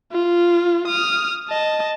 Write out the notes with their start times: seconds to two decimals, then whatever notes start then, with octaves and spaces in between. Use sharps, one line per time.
0.12 F4
0.87 D#6 F6
1.49 D#5 A5